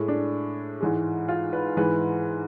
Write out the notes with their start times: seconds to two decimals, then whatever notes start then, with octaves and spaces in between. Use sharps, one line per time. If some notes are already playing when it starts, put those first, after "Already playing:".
Already playing: A2 G#3
0.08 D4
0.80 G#2 E3 G#3
1.28 F4
1.53 B4
1.77 G#2 E3 G#3 B4